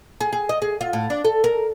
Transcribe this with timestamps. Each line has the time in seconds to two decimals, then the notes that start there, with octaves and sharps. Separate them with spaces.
0.21 G#4
0.33 G#4
0.49 D#5
0.62 G#4
0.81 F4
0.93 A2
1.10 D4
1.24 A4
1.44 A#4